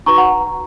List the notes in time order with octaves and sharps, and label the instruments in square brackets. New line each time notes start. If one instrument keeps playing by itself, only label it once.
[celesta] D#4 F#4 B4 A#5 C#6
F#5 A#5